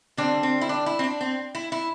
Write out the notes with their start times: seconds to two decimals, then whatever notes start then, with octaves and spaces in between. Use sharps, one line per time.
0.17 D3 G3 C4 D4
0.43 C4
0.61 E4
0.69 D4
0.86 E4
0.99 C4
1.04 D4
1.21 C4
1.55 E4
1.72 E4